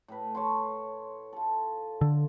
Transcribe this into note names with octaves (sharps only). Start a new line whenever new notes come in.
A2 B4
C#5 A5 C6
F4 A4
D3